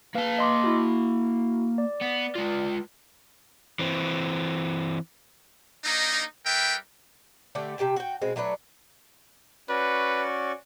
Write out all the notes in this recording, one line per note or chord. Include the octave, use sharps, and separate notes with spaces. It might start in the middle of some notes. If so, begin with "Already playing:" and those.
A#3 B4 F5 A5
D#5 C6 D6
E4 F#4
D5
B3
G#3 F4
E3 C4
A#3 D4 D#4
G3 A#4 B4 E5 G5
D3 A3 G4 D5
C3 G4 G5 A5
F#4 G5
B2 G#3 C4
F#3 A3 D4 B4
C#4 F#4 B4 D5